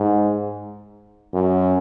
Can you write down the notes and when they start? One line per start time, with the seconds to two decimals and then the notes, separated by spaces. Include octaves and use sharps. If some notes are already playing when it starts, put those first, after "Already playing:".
Already playing: G#2
1.33 F#2